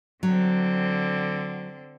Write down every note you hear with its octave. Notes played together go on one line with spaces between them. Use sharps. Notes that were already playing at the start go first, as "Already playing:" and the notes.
D3 F#3 C4